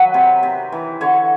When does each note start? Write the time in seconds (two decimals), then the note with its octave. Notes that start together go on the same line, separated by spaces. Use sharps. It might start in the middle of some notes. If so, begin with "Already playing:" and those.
Already playing: D#3 F#3 B4
0.14 C3
0.43 C3
0.72 E3
1.01 D3 C#5